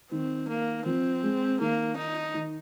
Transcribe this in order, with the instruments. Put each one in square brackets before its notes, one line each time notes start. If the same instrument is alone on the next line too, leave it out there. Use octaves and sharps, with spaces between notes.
[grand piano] D#3 [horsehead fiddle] C4
[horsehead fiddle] A#3
[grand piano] F3 [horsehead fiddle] C4
[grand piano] G#3
[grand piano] D#3 [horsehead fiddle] A#3
[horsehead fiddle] D#4
[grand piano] D#3